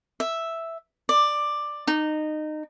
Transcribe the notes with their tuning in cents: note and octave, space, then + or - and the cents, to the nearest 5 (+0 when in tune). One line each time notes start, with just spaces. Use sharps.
E5 +0
D5 +10
D#4 -20